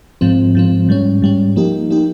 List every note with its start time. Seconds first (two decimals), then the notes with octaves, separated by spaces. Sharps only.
0.21 G#2 F3 C4
0.55 G#2 F3 C4
0.89 G#2 G3 C#4
1.22 G#2 G3 C#4
1.56 F3 A#3 D#4 G4
1.90 F3 A#3 D#4 G4